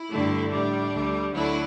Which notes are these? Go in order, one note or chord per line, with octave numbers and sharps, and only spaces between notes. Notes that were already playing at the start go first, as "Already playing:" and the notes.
Already playing: E4
G2 D3 A3
A2 G3 D4
D2 D3 G3
D2 D3 F#3 A3 E4